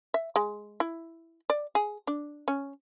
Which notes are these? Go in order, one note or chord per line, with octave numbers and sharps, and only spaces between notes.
E5
G#3
E4
D5
G#4
D4
C#4